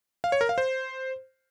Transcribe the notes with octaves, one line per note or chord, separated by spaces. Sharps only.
F5
C#5
A#4
F5
C5